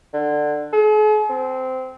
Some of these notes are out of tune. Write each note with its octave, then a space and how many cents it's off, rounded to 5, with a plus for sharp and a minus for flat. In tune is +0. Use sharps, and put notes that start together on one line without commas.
D3 +15
G#4 +45
C4 -15